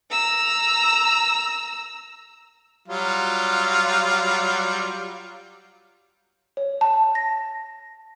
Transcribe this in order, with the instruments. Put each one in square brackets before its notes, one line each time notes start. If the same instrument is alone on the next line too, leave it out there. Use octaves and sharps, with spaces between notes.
[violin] A#5 E6
[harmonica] F#3 G3 F4
[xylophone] C#5
A5
A#6